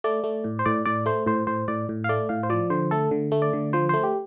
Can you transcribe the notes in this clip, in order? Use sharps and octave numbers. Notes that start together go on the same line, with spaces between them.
A3 D5
A3
A2
C5
A2 D5
A2 D5
A3 C5
A2 C5
A2 C5
A2 D5
A2
F5
A3 D5
A2 F5
C5
F3 D5
D3 C5
A3 A4
D3
A3
D5
D3
F3 C5
A3 C5
G4